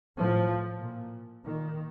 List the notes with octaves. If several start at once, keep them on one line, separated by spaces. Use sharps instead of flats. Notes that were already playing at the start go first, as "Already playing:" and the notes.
A2 F3
A#2
A#2 D#3